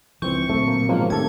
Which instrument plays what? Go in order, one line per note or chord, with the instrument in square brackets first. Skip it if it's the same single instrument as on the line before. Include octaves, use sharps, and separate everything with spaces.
[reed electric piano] C#2 C4 G6 [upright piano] E3 [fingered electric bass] F3 [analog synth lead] C#6
[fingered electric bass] A#2 D3 F#3 [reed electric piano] A3 E5 [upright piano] C4
[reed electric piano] A#3
[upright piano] G#2 B2 C#4 [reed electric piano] F3 [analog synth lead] A#3
[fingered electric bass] A#1 C4 [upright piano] D#3 A3 [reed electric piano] G4 A4 [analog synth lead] G#6